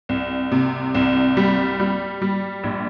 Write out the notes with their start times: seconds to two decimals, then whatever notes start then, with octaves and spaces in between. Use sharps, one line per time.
0.09 C2
0.52 C3
0.95 C2
1.37 G3
1.80 G3
2.22 G3
2.64 A#1